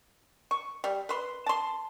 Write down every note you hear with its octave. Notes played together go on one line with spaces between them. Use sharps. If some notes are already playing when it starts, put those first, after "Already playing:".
C#6
G3
B4 C6
A5 C6